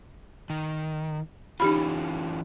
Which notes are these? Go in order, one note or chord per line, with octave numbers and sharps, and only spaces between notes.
D#3
E3 C#4 D#4 F4 G4 B5